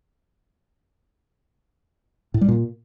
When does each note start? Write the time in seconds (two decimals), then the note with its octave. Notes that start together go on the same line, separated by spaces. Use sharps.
2.34 A2
2.41 G3
2.48 A#2